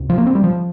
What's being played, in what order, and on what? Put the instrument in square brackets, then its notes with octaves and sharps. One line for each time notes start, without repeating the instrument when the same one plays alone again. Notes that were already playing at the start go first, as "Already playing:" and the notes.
Already playing: [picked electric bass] C#2 C3
F3
A#3
C4
G3
F3